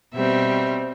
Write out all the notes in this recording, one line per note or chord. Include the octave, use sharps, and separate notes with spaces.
B2 G3 C4 E5